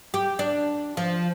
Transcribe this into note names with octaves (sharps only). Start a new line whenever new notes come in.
G4
D4
F3